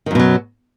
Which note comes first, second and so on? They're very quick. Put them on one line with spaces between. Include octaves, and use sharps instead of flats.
D#3 F#2 B2 F#3